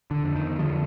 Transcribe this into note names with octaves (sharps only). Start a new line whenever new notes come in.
D3
F2
D#3
F2 D3 F3